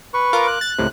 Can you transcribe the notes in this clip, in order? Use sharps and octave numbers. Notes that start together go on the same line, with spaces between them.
B4 C#6
F4 A#4 D6
F#6
A6
C#2 A2 C3